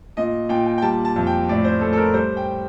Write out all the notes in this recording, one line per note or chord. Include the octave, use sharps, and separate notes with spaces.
A#2 D#5
A#2 G5
G5
G5
G3 A5
A5
F2
G5
A2 D5
C5
A2 A4
A4
A#4
G3 C5
G5